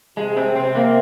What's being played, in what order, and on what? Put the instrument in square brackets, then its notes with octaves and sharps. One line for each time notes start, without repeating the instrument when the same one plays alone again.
[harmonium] C3 [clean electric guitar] G#3
[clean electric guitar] C4
[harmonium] C3 [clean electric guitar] C4
[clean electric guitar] A#3